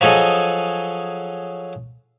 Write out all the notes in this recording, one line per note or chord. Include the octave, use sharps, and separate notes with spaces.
F3 F#3 G#4 A4 D#5